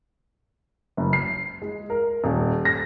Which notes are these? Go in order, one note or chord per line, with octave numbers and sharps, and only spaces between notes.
F#1
C7
G#3
A#4
D#1
A#6